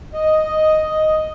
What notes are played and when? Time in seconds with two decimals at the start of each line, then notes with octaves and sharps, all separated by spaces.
0.13 D#5